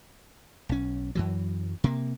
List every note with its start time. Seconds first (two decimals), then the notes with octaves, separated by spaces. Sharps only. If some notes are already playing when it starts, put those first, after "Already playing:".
0.69 B1 C#4
1.15 F#2 E3 F#3
1.84 C3 A#3